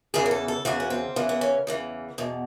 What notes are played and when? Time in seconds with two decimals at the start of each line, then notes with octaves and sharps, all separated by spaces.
0.14 E2 C#3 E3 G#4
0.26 A#4
0.31 A4
0.48 A4
0.65 E2 C#3 E3 F#4
0.80 B3
0.90 C4
1.16 E2 C#3 E3 B3
1.29 B3
1.41 C#4
1.67 E2 C#3 E3
2.18 E2 B2